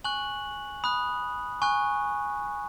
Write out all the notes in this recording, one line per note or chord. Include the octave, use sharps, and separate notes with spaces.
G#5 C#6 F#6 F#7
B5 D#6 F#6
G#5 C#6 F#6